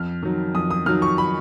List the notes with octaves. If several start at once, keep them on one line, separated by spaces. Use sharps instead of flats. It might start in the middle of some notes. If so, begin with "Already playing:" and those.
Already playing: F2 F6
D#3 F#3
F2 D#6
D#6
D#3 F#3 F6
C#6
B5